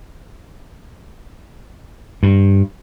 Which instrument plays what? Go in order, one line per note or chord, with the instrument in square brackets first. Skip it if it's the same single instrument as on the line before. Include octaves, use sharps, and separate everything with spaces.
[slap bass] G2